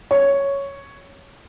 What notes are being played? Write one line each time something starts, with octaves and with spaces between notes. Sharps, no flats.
C#5